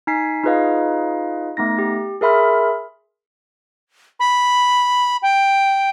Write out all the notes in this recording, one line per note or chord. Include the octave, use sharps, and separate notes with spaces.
D#4 G#5 B6 C7
D#4 F4 G#4 B4 D#5 F5
A3 B3 D#4 A#6
G4
G#4 A#4 E5 B5 C6 F6
B5
G5